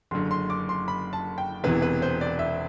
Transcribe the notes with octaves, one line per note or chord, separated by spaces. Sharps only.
F#1 F#2 D3 C6
C6
D6
C6
B5
A5
G5
E1 E2 C3 E3 B4
B4
C5
D5
E5